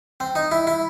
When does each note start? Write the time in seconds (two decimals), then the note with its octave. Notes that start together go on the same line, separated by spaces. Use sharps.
0.20 C4
0.35 D#4
0.51 E4
0.67 E4